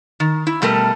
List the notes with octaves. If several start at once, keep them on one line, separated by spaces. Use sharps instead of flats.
D#3
E4
B2 G3 A3 A4 A#4 A5